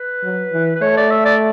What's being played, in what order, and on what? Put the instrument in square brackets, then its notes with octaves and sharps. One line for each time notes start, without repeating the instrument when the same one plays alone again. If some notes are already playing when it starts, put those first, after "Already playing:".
Already playing: [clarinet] B4
[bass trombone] F#3
E3
[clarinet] B4
[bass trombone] A3 [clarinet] C#5
[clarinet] D5
E5
D5